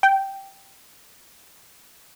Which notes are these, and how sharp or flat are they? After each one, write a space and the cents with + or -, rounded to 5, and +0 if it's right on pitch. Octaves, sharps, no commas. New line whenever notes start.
G5 -5